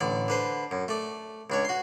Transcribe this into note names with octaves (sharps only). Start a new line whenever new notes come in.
A1 D3 D5
D3 B4 C5
F#2
A3 D5
C#2 D4 C#5
F#4 C6